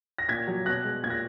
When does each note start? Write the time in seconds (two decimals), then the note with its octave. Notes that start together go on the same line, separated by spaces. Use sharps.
0.18 A#6
0.28 A#2 G#6 B6
0.47 F#3
0.66 B2 F#6 A#6
0.85 G#3
1.04 A#2 G#6
1.10 A#6